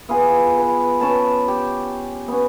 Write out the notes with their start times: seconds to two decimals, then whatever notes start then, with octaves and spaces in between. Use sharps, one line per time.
0.09 B3 F4 G#4 G#5
0.58 B4
1.01 C#4 B4 A5
1.48 G4
2.28 B3 C#4